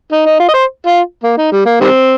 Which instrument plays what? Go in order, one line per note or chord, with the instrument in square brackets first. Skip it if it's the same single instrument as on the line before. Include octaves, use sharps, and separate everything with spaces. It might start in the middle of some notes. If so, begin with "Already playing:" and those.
[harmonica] D#4
D#4
F4
D#5
C5
F4
A#3
D#4
G3
A#3
D#3 G3 C4